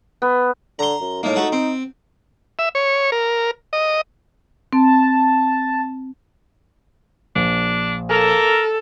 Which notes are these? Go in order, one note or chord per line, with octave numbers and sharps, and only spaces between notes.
B3
D3 A#5 C6
F#2
A2 A#3 D#4
A3 F#4 A5
C4
E5
C#5
A#4
D#5
C4 A5
A#1 D4
A#3 A4 A#4